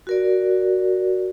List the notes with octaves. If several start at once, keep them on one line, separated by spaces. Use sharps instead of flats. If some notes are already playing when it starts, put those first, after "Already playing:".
F#4 A#4 D5